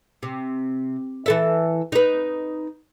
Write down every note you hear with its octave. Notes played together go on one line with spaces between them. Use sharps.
C3
E3 A4 E5
D#4 B4